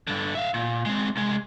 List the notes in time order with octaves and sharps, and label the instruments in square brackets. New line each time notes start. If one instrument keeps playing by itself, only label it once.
[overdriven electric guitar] G2 D3
E5 F5
A#2
G#3 C4
C2 G#3